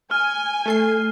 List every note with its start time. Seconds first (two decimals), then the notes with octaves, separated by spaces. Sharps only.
0.11 G#5 F6
0.66 A3 A4 C7